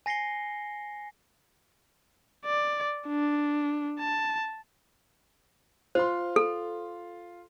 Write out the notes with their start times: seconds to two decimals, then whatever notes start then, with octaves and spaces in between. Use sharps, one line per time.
0.06 G#5 A#6 C7 C#7 G7
2.46 D5
3.07 D4
3.99 A5
5.95 F4 C5 C6
6.36 A4